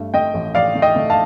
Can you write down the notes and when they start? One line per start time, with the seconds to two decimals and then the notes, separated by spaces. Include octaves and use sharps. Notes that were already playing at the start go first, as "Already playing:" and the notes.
Already playing: G2 A3
0.14 A3 D#5 G5
0.34 A1
0.55 A1 D5 F5
0.75 A3
0.82 D#5 G5
0.96 A3
1.10 F5 A5